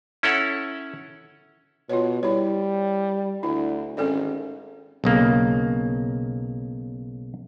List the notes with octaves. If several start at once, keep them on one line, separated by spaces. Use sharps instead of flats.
C#4 E4 A4 C#5 F#5
B2 F4 C#5
G3 E4 C#5
D2 E4
G#1 C#4 A4 D5
B1 C#3 A#3